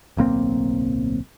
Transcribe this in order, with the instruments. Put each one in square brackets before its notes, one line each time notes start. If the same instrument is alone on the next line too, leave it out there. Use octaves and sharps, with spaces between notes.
[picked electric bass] D1 B1 A#3 C4